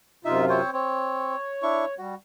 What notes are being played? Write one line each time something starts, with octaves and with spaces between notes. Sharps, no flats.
F#2 C3 D#4 F4 E5
C4 C5 C#5
C4 C#5
D4 E4 C#6
G3 F#4